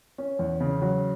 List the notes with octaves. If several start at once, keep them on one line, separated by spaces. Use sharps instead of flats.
C#4
E2
C#3
F#3